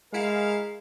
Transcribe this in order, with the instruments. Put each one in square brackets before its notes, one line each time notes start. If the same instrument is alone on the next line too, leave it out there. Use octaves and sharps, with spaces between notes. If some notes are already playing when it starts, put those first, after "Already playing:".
[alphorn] G#3 [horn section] E4 A#4 F5